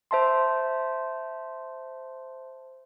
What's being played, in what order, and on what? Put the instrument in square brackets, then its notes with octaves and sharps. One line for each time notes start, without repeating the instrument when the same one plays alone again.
[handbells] C5 E5 A5 C6